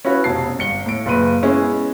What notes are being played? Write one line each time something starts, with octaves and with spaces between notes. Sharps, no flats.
C#4 E4 F#4 B4 C#5
F1 B2 A5 C7
G1 C#7 G7
A2 D7
F#1 A#2 B4 D#7
G#3 B3 C#4 E4 G#4